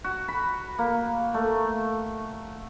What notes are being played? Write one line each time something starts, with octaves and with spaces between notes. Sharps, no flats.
F#4
B5
A#3
A3